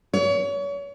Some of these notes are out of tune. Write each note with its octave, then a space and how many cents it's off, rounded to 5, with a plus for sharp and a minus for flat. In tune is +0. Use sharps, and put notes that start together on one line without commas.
C#5 +35